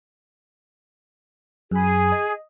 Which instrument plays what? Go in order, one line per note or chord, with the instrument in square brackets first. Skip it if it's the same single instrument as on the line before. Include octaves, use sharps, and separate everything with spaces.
[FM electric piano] F#2 B5 [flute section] G#4
[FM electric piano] D#5